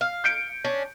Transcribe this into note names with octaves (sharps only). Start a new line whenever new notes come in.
F5
G6 C#7 D7
C#4 D4